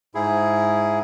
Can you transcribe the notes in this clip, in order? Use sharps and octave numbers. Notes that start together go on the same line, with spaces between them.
G#2 E4 G#4